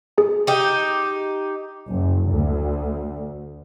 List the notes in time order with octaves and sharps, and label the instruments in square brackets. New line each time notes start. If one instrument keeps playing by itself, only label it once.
[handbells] G#4 G#5
[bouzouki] D#4 G4
[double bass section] F#1
D2